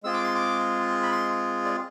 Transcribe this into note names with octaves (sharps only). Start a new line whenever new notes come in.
G#3 C4 F4 G#4 E6
D6
C6
D6
B5
C6
D5